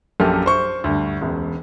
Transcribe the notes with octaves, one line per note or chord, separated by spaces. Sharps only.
A#1 F#2 A#3 G4 A4 F6
C5 C#6
D2 G2
E1 C#2